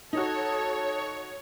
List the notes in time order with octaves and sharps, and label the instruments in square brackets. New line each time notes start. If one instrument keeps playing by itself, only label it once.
[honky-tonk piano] D#4 F#4 [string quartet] A4 [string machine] C#5